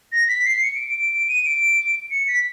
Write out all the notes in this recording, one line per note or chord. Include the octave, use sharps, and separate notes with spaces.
A#6
B6
C7
C#7
D7
D7
D7
D7
D#7
D7
C#7
B6